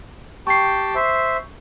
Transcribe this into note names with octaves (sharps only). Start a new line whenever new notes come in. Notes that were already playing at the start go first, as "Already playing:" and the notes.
G4 G5 A5 C#6 C7
C5 E5